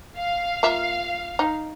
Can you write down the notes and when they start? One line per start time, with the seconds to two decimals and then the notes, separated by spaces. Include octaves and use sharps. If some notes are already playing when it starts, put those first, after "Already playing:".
0.17 F5
0.63 A#3 F4 E5
1.39 D#4